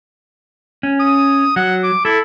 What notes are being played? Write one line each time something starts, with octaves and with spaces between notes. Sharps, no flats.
C#4
D#6
F#3 F#5
D6
E4 A4